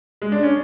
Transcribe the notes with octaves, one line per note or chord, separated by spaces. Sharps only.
G#3
D4
C#4